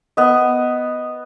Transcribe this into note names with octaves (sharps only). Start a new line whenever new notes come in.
B3 D#5